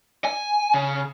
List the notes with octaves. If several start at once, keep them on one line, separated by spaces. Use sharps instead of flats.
G#5
C#3